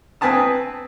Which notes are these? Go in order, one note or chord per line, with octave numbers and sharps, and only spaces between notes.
C4 B4 G#5 A5 D#6